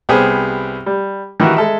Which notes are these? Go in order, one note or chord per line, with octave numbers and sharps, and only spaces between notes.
C2 B3 G4 G#4 C5
G3
D#3 E3 E4 F#4 G4
G#3 A4 E5